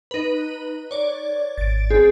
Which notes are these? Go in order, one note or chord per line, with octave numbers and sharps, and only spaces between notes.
D#4 B4
C#5 D5
G#1 A6 D7
C4 G#4